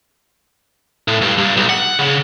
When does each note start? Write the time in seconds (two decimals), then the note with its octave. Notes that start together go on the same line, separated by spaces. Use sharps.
1.08 A2
1.22 G2
1.38 G2
1.57 B1
1.69 F#5
1.99 C#3